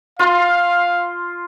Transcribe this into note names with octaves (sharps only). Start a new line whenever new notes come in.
F4 F5 C6